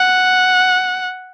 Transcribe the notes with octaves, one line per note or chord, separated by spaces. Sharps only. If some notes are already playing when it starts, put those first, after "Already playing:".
Already playing: F#5